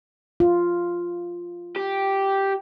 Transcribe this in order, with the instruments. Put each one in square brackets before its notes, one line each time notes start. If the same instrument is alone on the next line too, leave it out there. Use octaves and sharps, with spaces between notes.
[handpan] F4
[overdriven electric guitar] G4